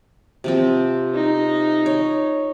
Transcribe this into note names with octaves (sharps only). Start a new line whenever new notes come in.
C3 F3 C4
D#4
C#5